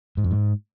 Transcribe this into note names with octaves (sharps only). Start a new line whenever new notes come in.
G#2
F2
G#2